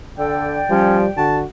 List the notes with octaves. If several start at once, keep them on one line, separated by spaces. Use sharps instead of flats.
D3 A4 D5 G5
F3 G3 C#4
D3 F#4 A5